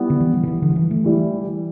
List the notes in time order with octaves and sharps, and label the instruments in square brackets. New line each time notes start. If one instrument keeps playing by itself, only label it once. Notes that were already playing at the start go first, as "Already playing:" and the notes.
Already playing: [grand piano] G3 B3 E4 G4
[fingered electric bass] D3
E3
G3
D3
E3
D3
G3
E3
A3
[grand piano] E3 G3 E4